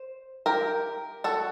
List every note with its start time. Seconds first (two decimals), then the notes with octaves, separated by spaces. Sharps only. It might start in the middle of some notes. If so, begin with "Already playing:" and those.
Already playing: C5
0.46 G4 A#4
1.24 F#4 A4